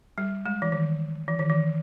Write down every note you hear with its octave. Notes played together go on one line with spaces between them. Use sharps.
G3
G#3
E3
D#3
E3
D#3
E3